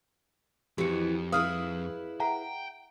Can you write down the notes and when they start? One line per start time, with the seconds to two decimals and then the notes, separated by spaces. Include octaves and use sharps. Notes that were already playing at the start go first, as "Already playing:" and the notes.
0.78 F2 E3 B3 F#4 G4 C#7
1.32 E4 G#4 B4 F5 D#6 F6
2.20 E5 F#5 G5 A#5